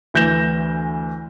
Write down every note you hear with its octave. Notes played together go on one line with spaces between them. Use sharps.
D2 E3 G6 A#6 E7 G7